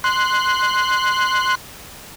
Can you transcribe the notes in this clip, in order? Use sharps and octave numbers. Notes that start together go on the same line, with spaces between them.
C6 F#6